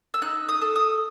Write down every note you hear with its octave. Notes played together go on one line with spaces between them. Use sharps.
E6
D#4 F#6
D#6
A4
D#6